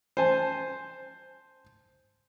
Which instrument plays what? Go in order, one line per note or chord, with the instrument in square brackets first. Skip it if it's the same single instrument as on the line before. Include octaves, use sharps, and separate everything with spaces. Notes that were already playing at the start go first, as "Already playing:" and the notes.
[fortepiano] C5 G#5 A5